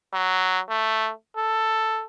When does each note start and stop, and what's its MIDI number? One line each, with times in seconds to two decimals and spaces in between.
0.13 0.60 54
0.69 1.10 57
1.37 2.04 69